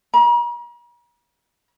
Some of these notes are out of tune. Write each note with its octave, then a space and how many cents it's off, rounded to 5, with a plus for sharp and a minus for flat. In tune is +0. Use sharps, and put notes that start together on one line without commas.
A#5 +45